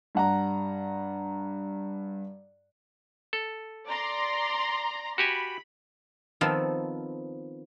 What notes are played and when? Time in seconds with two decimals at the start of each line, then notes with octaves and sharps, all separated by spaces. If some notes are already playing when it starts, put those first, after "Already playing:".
0.15 G2 F#5 A#5
3.33 A4
3.87 D5 A#5 C6
5.18 F#4 G4 G#5 B5
6.41 D#3 F3 B3 C4 A4